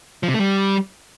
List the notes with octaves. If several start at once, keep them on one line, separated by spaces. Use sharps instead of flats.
F3
C3
A3
G3